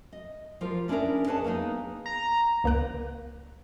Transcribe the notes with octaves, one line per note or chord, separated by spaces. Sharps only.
D#5
F3 F4 G4 A#4
C#4 D4 E4 G4 G#4 A#4
G#4 B4 C#5 D#5 A5
A#3 B3 D#4 G#4
A#5
C#2 A#3 A#4 F#6 D7